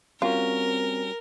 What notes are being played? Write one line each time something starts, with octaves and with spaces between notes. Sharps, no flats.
G3 C4 C#4 F4 F#4 A#4